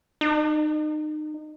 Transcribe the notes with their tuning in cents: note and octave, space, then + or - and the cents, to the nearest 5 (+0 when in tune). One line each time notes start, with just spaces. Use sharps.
D#4 -30